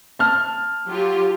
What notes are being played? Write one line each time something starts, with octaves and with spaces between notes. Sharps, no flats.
A5 F6
F#3 F4 G4